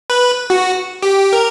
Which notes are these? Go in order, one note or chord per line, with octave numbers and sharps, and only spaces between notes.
B4
F#4
G4
A#4